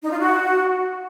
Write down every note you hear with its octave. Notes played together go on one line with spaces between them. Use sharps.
D#4
F4
F#4